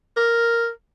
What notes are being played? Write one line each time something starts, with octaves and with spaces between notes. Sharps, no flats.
A#4